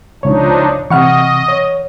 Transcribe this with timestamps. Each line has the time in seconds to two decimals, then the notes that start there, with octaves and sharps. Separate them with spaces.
0.23 C#2 F3 D4 D#4 C#5
0.90 C3 E3 D#5 F#5 C#6 F6
1.48 C#5